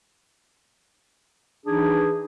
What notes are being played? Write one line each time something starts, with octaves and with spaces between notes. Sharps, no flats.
E3 D4 D#4 G#4